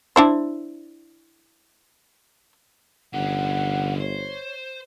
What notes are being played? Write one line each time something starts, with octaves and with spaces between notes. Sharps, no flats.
D4 E4 C5
G1 D3 C#4 F#5
C5 C#5